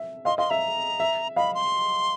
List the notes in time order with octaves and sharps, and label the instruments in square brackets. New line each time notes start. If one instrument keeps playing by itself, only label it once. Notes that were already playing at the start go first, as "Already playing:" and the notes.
Already playing: [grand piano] E5
[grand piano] D#5 F5 [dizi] C6
[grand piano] D#5 F5 [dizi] C6
[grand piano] E5 [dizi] A#5
[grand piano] E5
[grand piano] D#5 F5 [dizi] B5
[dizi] C6